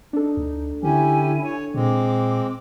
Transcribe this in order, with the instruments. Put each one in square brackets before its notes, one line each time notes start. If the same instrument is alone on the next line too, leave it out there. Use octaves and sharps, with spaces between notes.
[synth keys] D4 A4 [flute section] D#4
[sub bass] D2
[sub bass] D3 [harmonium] C#4 G4 [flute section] E4 G#5
[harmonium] C#5
[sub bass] A#2 [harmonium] G#3 C4 [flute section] D6